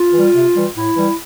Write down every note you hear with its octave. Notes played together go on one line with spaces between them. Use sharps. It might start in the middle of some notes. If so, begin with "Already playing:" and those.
Already playing: F4
E3 G3
C3
E3 G3
A2 E4
E3 G3